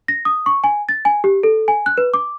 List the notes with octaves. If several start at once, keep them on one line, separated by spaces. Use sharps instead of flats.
A#6
D#6
C#6
G#5
A6
G#5
G4
A4
G#5
F#6
B4
D6